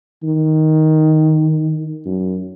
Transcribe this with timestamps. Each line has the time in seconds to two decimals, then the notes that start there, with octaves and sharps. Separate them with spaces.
0.24 D#3
2.06 F#2